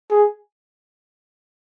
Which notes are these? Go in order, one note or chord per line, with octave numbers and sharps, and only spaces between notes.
G#4